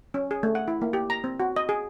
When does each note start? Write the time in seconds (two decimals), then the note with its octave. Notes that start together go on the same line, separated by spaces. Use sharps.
0.14 C#4
0.31 G#4
0.43 A3
0.55 F#5
0.68 E4
0.82 A#3
0.93 G4
1.10 A#5
1.24 C4
1.40 F#4
1.56 D#5
1.69 G#4